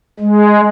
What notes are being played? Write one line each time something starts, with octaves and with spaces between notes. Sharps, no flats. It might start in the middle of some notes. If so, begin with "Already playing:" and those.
G#3